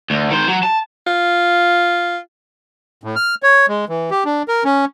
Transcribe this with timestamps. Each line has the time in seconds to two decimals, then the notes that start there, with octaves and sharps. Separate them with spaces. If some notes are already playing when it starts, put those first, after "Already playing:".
0.10 D2
0.30 D#3 C5
0.48 F#3
0.63 A5
1.07 F4
3.04 A2
3.16 F6
3.43 C#5
3.68 G#3
3.89 E3
4.11 G4
4.25 D4
4.48 A#4
4.64 C#4